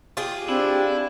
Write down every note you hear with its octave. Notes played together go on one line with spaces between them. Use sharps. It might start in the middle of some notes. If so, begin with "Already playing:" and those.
F4 G4 G#4
C4 D4 E4